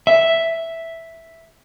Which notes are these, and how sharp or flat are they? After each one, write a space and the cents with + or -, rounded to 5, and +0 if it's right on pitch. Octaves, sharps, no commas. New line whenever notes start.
E5 +0